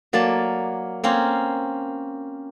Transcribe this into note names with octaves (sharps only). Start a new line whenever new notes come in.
F#3 A#3 D5 A5
A#3 C4 C#4 A#4